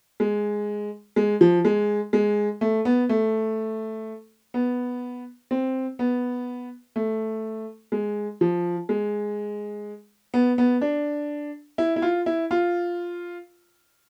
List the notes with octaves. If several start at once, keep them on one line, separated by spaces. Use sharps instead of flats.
G#3
G#3
F3
G#3
G#3
A3
B3
A3
B3
C4
B3
A3
G#3
F3
G#3
B3
B3
D4
E4
E4
F4
E4
F4